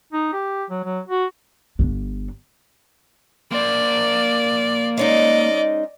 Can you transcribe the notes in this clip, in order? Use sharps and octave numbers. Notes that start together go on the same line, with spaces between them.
D#4
G4
F#3
F#3
F#4
G1 D4
A#3 C5 D5
G#3 C#4 D#4 D5 D#5